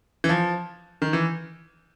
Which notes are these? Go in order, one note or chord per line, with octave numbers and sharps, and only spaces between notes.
E3
F3
D#3
E3